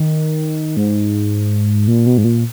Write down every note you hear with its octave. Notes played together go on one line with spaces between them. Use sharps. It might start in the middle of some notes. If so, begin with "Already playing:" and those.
Already playing: D#3
G#2
A#2
B2
G#2
A#2